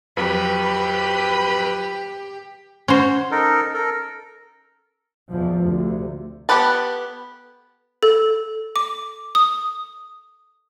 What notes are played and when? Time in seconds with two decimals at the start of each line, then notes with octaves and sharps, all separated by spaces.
0.17 F2 F#3 G4 B4 B5
2.88 C#4 F#4 C5
3.31 D#4 A4 A#4
3.74 A4 A#4
5.29 E2 B2 F3
5.63 D2 C3
6.49 B3 G4 A4 B4 A5
8.03 A4
8.76 D6
9.35 D#6